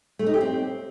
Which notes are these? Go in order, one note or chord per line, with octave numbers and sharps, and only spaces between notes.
A3
D#4
G4
C4